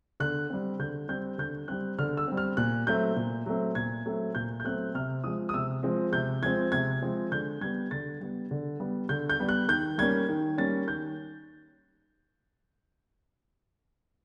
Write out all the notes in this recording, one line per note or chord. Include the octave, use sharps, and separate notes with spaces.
D3 F#6
G3 C4
D3 G6
G3 C4 G6
D3 G6
G3 C4 F#6
D3 F6
E6
G3 C4
F6
A#2 F#6
F#3 A3 C4 G6
A#2
F#3 A3 C4
A#2 G#6
F#3 A3 C4
A#2 G6
G6
F#3 A3 C4 F#6
C3 F6
F3 G#3 C4 D#6
D#6
C3 E6
F3 G#3 C4
C3 G6
F3 G#3 C4 G#6
C3 G#6
F3 G#3 C4
D3 G6
G3 B3 G#6
D3 A6
G3 B3
D3
G3 B3
D3 G6
G6
G3 B3
F#6
D#3 G6
G3 A#3 C#4 G#6
D#3
G3 A#3 C#4 A6
D#3 G6